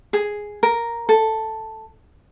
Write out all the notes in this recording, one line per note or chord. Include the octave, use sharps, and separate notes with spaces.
G#4
A#4
A4